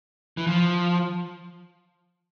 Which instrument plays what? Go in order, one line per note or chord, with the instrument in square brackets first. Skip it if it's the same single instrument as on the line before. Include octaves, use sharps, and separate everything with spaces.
[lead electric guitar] E3
F3